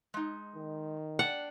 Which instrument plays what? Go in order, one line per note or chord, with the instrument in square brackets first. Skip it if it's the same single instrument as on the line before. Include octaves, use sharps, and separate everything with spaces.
[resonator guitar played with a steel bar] G#3 D#4
[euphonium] D#3
[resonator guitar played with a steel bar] D4 D5 G5 [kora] F#5